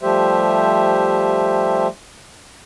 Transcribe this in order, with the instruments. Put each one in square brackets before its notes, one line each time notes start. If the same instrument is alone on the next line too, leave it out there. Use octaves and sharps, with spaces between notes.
[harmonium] F3 G3 A3 G4 C5 E5